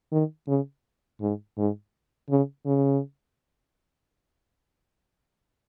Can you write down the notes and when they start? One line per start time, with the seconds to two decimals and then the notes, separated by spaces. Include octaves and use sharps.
0.12 D#3
0.48 C#3
1.21 G#2
1.58 G#2
2.30 C#3
2.66 C#3